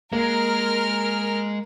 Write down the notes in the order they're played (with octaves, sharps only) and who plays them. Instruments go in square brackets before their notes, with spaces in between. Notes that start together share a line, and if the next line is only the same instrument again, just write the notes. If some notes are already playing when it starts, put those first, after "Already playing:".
[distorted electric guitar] G#3 [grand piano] A#3 [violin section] A#4 F6